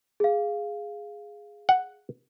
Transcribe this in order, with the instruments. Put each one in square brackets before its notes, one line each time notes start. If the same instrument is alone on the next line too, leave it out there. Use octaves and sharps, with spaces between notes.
[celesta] G#4 F5
[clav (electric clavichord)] F#5